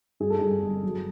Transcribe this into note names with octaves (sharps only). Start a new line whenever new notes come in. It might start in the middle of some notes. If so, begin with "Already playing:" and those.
G2 G#4
A4
G2 G#4
G1
F#3